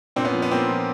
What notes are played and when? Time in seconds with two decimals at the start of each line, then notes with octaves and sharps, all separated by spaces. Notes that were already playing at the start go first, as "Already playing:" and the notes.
0.16 A#2 C4 D4
0.25 B3 C#4
0.33 F3
0.42 B3
0.51 A#2 A#3 C4
0.69 F3